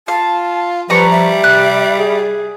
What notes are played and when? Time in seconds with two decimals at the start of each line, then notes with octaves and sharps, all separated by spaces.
0.08 F4 F5 A5
0.90 F3 G3 B4 A#5 C#6
1.11 E5
1.44 C3 F#6
1.99 G#4